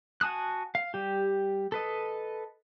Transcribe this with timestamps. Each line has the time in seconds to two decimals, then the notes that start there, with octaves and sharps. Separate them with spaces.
0.21 F#4 G#5 A5 D#6 F#6
0.75 F5
0.94 G3 G4
1.72 A4 B4 D#5